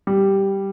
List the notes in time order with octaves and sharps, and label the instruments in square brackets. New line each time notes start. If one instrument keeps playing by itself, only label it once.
[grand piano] G3